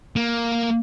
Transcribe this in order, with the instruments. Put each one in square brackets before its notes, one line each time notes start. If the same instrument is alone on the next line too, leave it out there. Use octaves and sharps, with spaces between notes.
[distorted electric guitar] A#3